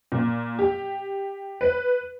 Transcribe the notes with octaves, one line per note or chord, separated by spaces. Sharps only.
A#2
G4
B4